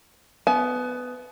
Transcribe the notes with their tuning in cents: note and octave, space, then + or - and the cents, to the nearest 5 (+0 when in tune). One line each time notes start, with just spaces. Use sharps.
B3 +15 G#5 +45